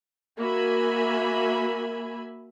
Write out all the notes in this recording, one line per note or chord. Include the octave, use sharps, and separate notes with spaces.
A#3 F#4 E5 G#5 B5